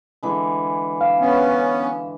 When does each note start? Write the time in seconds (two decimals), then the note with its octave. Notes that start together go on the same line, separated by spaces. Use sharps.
0.23 D3 E3 G#3
1.01 E5 F5
1.20 B3 C#4